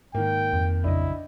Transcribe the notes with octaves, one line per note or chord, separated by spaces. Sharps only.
G#2 D#3 A#3 G5
F2
A#1 F#2 C#3 D4 E4 D#5